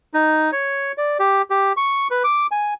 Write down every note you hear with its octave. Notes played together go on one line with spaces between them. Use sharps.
D#4
C#5
D5
G4
G4
C#6
B4
D6
G#5